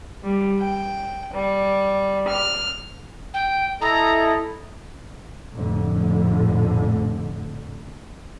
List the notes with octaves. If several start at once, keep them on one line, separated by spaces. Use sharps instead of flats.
G3
G5
G3
F6
G5
E4 A4 D#5 A#5
F1 A#1 F2 A2 D3